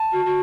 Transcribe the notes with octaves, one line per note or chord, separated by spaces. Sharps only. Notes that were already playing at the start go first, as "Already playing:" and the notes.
Already playing: A5
F#4
F#4